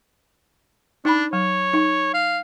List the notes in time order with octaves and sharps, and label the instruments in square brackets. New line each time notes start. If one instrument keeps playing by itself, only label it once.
[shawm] D4 [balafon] D#4 B5
[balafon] F#3 [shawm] C#5
[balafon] D#4
[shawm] F5